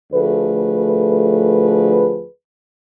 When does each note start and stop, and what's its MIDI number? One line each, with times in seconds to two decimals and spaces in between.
0.13 2.25 38
0.13 2.25 53
0.13 2.25 57
0.13 2.25 68
0.13 2.25 71